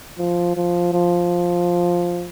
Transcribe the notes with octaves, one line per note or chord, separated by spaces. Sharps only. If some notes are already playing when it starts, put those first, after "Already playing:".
F3
F3
F3